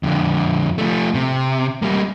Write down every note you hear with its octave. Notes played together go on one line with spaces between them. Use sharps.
F2 D3
F3 A3
C3
G3 A#3